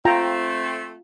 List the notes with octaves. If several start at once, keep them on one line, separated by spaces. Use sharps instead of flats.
A3 C4 F4 G5 A#5